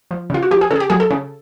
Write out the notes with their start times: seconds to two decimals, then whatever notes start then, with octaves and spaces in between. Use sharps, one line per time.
0.11 F3
0.30 C#3 F4
0.43 F#4
0.51 F3 G4
0.61 G#4
0.71 C#3 A4
0.76 G#4
0.80 G4
0.90 F#3 G#4
1.00 A4
1.10 C#3